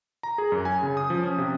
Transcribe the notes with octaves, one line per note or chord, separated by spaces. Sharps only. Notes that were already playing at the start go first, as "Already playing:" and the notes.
A#5
G#4
F#2
G#5
C#3
D#6
F3
C#4
C3